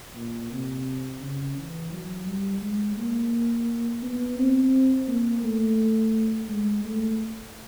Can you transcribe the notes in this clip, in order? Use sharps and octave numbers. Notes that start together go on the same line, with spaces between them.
A#2
C3
C#3
E3
F#3
G3
G#3
A#3
B3
C4
A#3
A3
G#3
A3